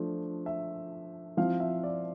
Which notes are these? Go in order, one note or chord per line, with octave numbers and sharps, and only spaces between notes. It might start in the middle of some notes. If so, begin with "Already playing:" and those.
Already playing: F3 A3 D4
E5
F3 C4 E4 F5
E5
D5